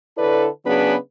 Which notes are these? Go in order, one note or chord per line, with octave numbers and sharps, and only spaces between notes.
D3 E4 A4 B4 C#5 D5
C#3 F#3 B3 D4 G#4 B4